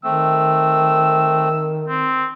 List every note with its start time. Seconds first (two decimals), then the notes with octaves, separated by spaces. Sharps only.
0.04 D#3 A3 C4 E6
1.88 C4